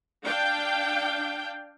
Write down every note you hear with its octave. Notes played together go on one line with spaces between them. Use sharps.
D4 F5 G5